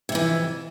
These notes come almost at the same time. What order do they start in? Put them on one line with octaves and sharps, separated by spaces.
C3 F2 E3